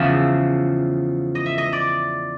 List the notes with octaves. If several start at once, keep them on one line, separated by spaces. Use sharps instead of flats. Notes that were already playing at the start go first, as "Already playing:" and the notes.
Already playing: E2 C#3 F3 E5
D#5
E5
D#5
D5